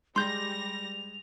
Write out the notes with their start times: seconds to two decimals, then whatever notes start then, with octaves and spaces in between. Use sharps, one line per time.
0.16 G3 G#3 C6 G6 A#6 F7